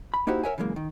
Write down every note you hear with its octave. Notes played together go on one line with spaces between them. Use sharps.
B5
A#3 D#4 E4 F#4 G4 C5
A#4 C#5 E5 F#5 G#5
C#3 E3 F#3 G#3 A#3
D#3